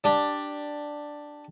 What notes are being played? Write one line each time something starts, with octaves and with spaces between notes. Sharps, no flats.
D4 G4